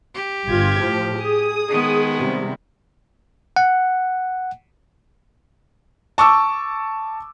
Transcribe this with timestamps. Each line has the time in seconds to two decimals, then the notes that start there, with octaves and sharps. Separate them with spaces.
0.14 G4
0.47 G1 F4 G#6
0.79 A2 F3
1.17 G#4 D#6
1.69 D#3 G#3 B3
2.17 C3 G3
3.56 F#5
6.18 A5 C#6 D6 E6